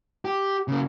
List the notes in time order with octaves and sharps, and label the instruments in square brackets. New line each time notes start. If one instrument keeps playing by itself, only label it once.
[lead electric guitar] G4
C#3 A#3